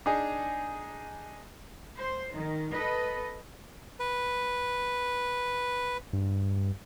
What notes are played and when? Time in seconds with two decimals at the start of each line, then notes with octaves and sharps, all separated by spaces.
0.06 D4 D#4 G#4
1.95 C5
2.35 D#3
2.72 A4 B4 D#5
4.00 B4
6.13 G2